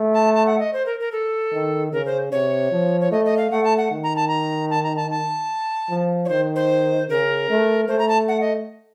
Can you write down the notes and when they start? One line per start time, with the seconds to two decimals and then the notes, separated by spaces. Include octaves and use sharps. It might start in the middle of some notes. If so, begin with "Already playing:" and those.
Already playing: A3
0.14 A5
0.34 A5
0.46 F#5
0.59 D#5
0.73 C5
0.86 A#4
1.00 A#4
1.12 A4
1.52 D#3
1.92 C#3 A#4
2.06 C5
2.32 C3 C#5
2.71 F3
3.01 C#5
3.11 A3 D#5
3.25 D#5
3.38 F5
3.51 A3 F#5
3.64 A5
3.77 F#5
3.91 D#3
4.04 A#5
4.16 A5
4.28 A#5
4.70 A5
4.83 A#5
4.96 A5
5.11 A5
5.90 F3
6.25 C#5
6.29 D#3 C5
6.56 C5
7.09 C#3 A#4
7.49 A3
7.88 A3 C5
7.99 A#5
8.09 A5
8.28 F#5
8.41 D#5